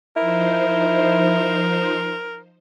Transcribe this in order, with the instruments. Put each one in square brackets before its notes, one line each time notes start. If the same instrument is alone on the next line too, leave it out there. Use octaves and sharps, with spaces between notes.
[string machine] F3 D#4 C5 [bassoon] E4 [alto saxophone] A#4